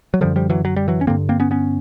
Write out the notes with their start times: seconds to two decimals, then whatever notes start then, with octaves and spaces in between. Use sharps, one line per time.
0.14 F#3
0.21 F#2 D3 F3 G3
0.36 F3 G3
0.50 E3 F#3
0.65 F#3
0.76 G3
0.88 E3 F#3
1.01 C#4
1.07 G2 D3 A#3 C4
1.29 A#3 C4
1.40 B3 C#4
1.51 B3 C#4